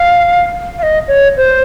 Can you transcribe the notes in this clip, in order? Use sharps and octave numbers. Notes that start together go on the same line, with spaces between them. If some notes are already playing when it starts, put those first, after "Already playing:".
Already playing: F5
F5
D#5
C#5
C5